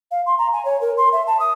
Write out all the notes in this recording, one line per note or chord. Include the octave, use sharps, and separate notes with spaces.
F5
C6
A#5
G#5
C#5
A#4
C6
E5
A5
D#6